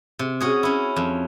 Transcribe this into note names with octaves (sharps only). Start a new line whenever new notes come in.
C3
C#4 F#4 G#4
C#4 E4
F2